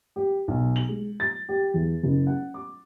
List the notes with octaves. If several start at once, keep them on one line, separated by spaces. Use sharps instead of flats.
G4
B1
F#7
G#3
A6
G4
E2
F#1
F#5
D6